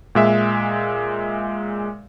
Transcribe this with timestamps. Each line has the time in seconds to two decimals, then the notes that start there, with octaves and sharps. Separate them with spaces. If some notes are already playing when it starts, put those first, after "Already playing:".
0.15 A#2 G#3 E5